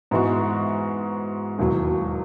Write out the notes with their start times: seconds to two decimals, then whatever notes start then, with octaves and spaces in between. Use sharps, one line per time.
0.11 G#2 E3 G#3 B3 F#4
1.59 E1 D#2 D#3 F#3